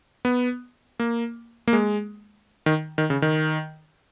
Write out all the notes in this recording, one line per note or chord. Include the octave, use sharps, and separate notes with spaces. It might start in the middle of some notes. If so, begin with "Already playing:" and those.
B3
A#3
A#3
G#3
D#3
D#3
C#3
D#3